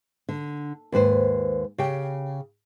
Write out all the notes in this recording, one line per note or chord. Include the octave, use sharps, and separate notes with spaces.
D3
D#2 G#2 B4 C5
C#3 G4 G5